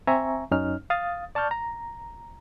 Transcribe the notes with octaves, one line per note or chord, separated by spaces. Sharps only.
C4 E5 G#5 A#5 C#6
F#2 C#4 D#4 F6
F5 D#6 A6
D5 A5 C#6 F6 G6
A#5